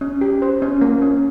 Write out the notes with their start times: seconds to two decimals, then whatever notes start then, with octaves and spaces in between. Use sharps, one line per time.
0.01 C#4
0.21 G4
0.42 C5
0.62 C#4
0.81 A#3
1.02 C#4